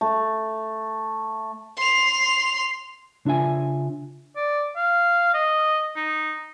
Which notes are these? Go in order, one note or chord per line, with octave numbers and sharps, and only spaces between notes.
A3
C6 F7
C#3 D4 F4 E5 G#5
D5
F5
D#5
D#4